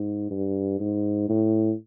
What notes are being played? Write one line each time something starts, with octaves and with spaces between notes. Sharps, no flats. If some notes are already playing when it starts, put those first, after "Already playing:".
Already playing: G#2
G2
G#2
A2